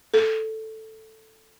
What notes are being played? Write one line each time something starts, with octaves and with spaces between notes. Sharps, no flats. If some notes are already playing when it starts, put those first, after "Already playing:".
A4